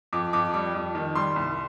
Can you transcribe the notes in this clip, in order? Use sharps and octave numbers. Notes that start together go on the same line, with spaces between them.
F2 D6
F2 D6
G3 D6
F2
D#3
G3 C6
C2